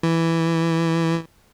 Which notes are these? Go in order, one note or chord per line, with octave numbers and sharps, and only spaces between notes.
E3